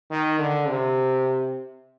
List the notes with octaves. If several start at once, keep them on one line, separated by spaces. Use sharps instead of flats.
D#3
D3
C3